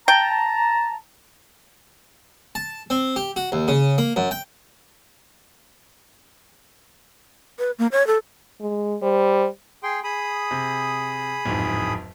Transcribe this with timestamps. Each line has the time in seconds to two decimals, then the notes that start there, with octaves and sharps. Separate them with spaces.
0.08 G5 A5 A#5
2.55 A5
2.90 C4
3.16 G4
3.36 F#4
3.52 D#2
3.68 C#3
3.98 A#3
4.16 F#2
4.31 G5
7.59 B4
7.79 A#3
7.92 C#5
8.07 A4
8.61 G#3
9.03 G3 C5
9.83 G#4 G5 C6
10.04 G#4 B5 D#6
10.51 C3
11.46 D1 F2 G#2